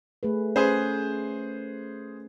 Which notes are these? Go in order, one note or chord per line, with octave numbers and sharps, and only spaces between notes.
A3 G#4 B4
C#4 G#4 B4 C5